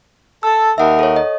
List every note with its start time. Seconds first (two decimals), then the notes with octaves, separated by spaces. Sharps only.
0.43 A4 E6
0.78 D#2 D#4 A#4 E5 F#5
0.99 A4 C#5
1.16 D#5